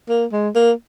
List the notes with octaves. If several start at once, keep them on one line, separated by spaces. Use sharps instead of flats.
A#3
G#3
A#3